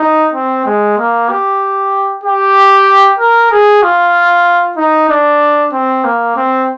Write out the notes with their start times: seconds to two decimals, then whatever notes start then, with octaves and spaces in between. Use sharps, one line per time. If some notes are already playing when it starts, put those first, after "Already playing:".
Already playing: D#4
0.33 C4
0.66 G#3
0.98 A#3
1.29 G4
2.23 G4
3.19 A#4
3.51 G#4
3.82 F4
4.77 D#4
5.09 D4
5.72 C4
6.04 A#3
6.36 C4